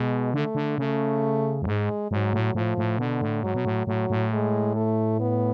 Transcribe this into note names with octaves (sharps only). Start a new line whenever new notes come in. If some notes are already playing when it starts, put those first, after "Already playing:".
Already playing: B2 G#3
D3 A3
D3
C#3 A3
F#2
G#2 G#3
G#2 F#3
A2
A2 F3
A2
B2 D3
A2
G#2 F#3
B2
A2
A2 F#3
A2
G#3
A3
B3